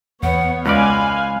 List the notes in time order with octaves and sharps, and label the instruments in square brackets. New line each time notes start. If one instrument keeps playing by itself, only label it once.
[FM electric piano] E2 [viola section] B3 C#5 [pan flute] F#5
[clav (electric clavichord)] C#2 D5 [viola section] F5 G#5 [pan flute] B5 [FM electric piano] F#6